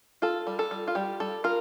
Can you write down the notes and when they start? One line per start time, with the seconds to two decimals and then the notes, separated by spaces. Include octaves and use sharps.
0.22 F4 A4
0.47 G3
0.59 A4
0.71 G3
0.88 F4
0.95 G3 G4
1.20 G3 A4
1.44 F4 A#4